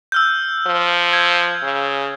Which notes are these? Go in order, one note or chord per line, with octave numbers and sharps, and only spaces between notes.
E6 F6 G6
F3
G#6
C#3